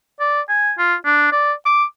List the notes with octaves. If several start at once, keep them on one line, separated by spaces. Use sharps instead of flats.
D5
G#5
F4
D4
D5
D6